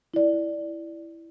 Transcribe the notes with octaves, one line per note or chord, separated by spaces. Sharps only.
E4 D5